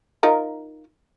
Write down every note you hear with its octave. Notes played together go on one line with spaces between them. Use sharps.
D#4 F4 A#4